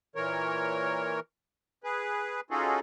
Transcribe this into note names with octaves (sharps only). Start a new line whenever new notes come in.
A#2 E3 A#4 C#5
G#4 B4
C#4 D#4 F4 F#4 G#4 A4